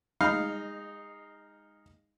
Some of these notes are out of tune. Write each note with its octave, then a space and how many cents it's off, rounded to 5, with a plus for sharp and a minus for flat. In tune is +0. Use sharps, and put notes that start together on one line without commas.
G#3 -25 D#4 +0 F5 +0